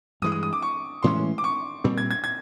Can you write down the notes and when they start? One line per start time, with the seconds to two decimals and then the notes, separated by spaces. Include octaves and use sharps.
0.22 G2 E3 G#3 D#6
0.32 D#6
0.43 D#6
0.53 D6
0.62 C#6
1.03 A2 E3 G#3 C#4 C6
1.38 D6
1.44 C#6
1.84 A#2 G3 C4
1.98 G#6
2.11 G#6
2.24 G#6